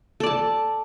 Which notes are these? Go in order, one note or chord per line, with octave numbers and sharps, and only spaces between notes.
A4 D5 A5